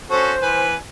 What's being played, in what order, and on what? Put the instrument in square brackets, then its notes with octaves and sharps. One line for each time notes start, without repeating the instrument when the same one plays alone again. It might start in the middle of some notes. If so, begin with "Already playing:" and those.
[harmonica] C#4 F#4 A4 [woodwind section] C5
[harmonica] E3 B4 G#5